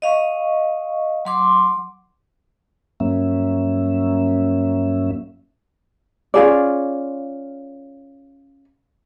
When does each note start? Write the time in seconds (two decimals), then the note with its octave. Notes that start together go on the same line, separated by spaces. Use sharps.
0.02 D#5 F5 C#6
1.25 F#3 C6 D6
3.00 G2 F#3 A#3 C#4 E5
6.34 C#4 F4 G#4 D5